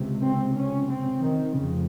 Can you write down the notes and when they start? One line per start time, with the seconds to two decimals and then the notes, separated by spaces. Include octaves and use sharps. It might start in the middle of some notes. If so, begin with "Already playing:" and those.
Already playing: C#2 C3
0.23 C4
0.57 C#4
0.90 C4
1.22 D#3
1.55 F1 F2 C#3